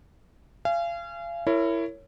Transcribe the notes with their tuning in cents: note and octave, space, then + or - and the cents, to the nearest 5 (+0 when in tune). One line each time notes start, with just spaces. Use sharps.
F5 -35 G#5 +0
E4 +15 A#4 -25 C#5 +0